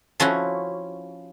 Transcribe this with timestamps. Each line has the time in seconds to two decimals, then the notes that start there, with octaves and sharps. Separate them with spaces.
0.20 F3 C#4 E4 F#4